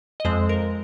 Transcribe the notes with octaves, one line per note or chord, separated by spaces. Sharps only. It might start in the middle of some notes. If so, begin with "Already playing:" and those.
D#5
F2 F3 G#3 C4 C5
A#4